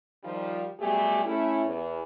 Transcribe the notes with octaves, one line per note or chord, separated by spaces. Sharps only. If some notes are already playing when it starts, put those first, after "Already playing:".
D#3 F3 G3
B2 F#3 G3 A3 G4 G#4
A3 C#4 E4
E2